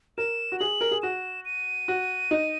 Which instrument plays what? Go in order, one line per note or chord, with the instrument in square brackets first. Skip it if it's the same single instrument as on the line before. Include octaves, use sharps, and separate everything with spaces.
[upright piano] A#4 [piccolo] E7
[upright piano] F#4
[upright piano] G#4 [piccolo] F#7
[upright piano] A#4
G#4
[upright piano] F#4 [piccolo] E7
[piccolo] D#7
[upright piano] F#4
D#4